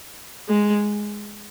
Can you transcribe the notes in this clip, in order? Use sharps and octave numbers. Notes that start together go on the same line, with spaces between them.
G#3